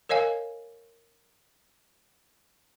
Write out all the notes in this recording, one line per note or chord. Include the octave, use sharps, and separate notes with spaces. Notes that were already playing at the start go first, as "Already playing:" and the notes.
A#4 C#5 D#5 F5 G#5